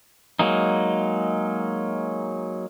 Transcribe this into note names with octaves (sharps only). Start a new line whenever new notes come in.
F#3 G#3 A#3 D#4